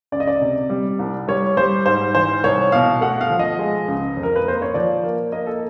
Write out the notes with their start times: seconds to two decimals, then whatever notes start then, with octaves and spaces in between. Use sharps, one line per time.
0.12 C#2 D5
0.20 D#5
0.27 D5
0.41 C3
0.70 G3
0.99 C2
1.28 G3 C#5
1.57 G3 C5
1.86 G#2 C5
2.15 E3 C5
2.44 C2 C#5
2.72 B2 F5
3.01 A3 F#5
3.21 F5
3.30 F3
3.39 D#5
3.59 G#3
3.88 C#2
4.17 F2
4.23 A#4
4.36 B4
4.46 A#3 C5
4.62 C#5
4.74 F3 D5
5.03 A#3
5.32 A#3 D#5
5.47 A4